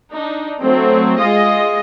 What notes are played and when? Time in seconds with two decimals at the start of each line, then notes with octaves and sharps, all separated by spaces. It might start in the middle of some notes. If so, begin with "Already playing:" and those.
0.13 D4 D#4
0.62 F#3 A3 C4
1.18 G#3 F4 D#5